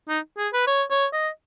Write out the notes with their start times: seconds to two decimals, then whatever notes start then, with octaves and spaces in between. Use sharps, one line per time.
0.09 D#4
0.38 G#4
0.53 B4
0.67 C#5
0.90 C#5
1.13 D#5